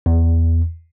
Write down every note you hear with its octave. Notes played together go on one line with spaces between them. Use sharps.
E2